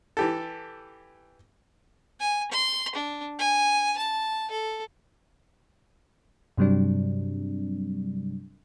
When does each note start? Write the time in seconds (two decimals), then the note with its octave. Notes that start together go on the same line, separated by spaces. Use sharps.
0.17 E3 G4 A4
2.20 G#5
2.51 C6
2.95 D4
3.39 G#5
3.98 A5
4.51 A4
6.57 G2 C3 F#3 G3 C4 D4